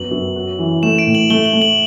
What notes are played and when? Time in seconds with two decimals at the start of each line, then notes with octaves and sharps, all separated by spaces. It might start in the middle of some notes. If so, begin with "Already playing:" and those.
Already playing: F#2 B3 F#7
0.11 F#2
0.36 F#4
0.59 E3
0.83 A3 E7
0.99 D7
1.07 A2
1.15 F#7
1.30 A3 G7
1.46 F#7
1.53 A3
1.62 F#7